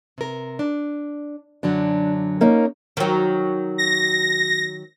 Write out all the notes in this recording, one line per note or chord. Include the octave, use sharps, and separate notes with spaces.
C3 A#4
D4
F#2 D3 F#3 D4
A#3 C#4 D#4
D#3 F#3
A#6